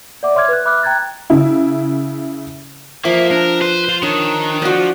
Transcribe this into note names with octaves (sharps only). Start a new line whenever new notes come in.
D5 E5 F#5 D6
C#5 E5 C6 D6 F6 G#6
B4 F#6
E5 B5 D6 F6 F#6
G5 A#5 F#6 G#6 A6
C#3 E4
F3 A#3 E5
D4 A#4
B4 C5
F4
D#3 D4 C#5
D4 F4 F#4 C5